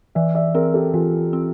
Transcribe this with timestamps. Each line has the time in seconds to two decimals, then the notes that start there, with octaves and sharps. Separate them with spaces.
0.15 E3 D5 E5
0.35 D5 E5
0.55 C4 G#4 A#4
0.74 G4 A4
0.94 E3 F4 G4
1.33 C4